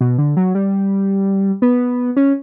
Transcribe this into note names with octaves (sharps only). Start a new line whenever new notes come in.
B2
D3
F#3
G3
B3
C#4